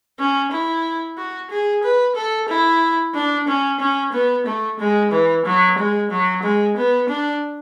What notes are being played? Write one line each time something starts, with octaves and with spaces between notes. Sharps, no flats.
C#4
E4
F#4
G#4
B4
A4
E4
D4
C#4
C#4
B3
A3
G#3
E3
F#3
G#3
F#3
G#3
B3
D4